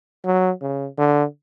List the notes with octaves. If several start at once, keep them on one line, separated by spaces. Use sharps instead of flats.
F#3
C#3
D3